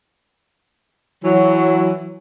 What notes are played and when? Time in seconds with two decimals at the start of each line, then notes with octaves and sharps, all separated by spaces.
1.24 E3 F#3